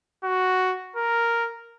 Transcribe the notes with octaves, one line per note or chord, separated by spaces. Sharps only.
F#4
A#4